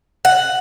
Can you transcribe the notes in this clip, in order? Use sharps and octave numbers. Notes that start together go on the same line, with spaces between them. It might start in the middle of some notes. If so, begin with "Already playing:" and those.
F#5